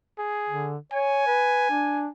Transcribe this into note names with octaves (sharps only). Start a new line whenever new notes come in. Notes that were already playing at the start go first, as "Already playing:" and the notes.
G#4
D3
C#5 G#5
B4
D4